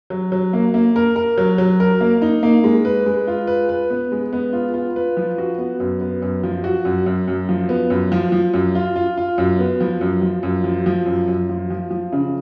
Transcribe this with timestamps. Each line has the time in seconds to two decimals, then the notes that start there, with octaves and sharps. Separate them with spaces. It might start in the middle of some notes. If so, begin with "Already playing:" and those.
0.10 F#3
0.32 F#3
0.53 A#3
0.74 A#3
0.96 A#4
1.16 A#4
1.38 F#3
1.58 F#3
1.80 A#4
2.01 A#3
2.22 D#4
2.43 A#3
2.64 G#3
2.85 B4
3.06 G#3
3.27 F4
3.47 B4
3.69 B4
3.90 B3
4.12 G#3
4.33 B3
4.53 F4
4.74 F4
4.96 B4
5.17 F3
5.38 F#4
5.58 B3
5.80 F#2
6.01 B3
6.22 F#2
6.44 F3
6.64 F#4
6.85 F#2
7.06 F#2
7.28 F#2
7.49 F3
7.69 B3
7.90 F#2
8.12 F3
8.32 F3
8.54 F#2
8.75 F4
8.96 F4
9.17 F4
9.38 F#2
9.59 B3
9.81 F3
10.01 F#2
10.22 F3
10.43 F#2
10.64 F3
10.86 F3
11.06 F#2
11.28 F#2
11.49 F3
11.70 F3
11.91 F3
12.12 C#3